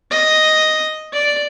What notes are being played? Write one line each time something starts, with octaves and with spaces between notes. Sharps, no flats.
D#5
D5